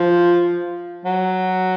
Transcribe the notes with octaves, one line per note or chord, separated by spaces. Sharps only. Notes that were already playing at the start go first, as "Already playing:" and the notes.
Already playing: F3
F#3